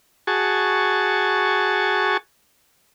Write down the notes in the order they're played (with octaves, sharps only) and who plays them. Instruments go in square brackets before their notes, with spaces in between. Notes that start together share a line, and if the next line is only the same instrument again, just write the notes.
[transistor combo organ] F#4 G#4 A5 C#6